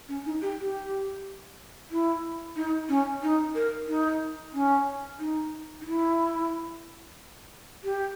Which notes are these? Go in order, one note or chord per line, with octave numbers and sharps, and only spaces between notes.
C#4
D#4
G4
G4
E4
D#4
C#4
D#4
A#4
D#4
C#4
D#4
D#4
E4
G4